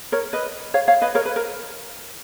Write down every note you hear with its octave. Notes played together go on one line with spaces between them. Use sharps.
A#4 C#5
B4 D#5
C#5 F5
C#5 F5
B4 D#5
A#4 C#5
B4
A#4